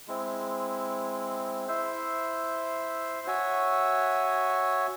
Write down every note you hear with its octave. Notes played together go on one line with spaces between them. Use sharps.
G#3 C4 E4
E4 C5 E5
F#4 C#5 E5 G#5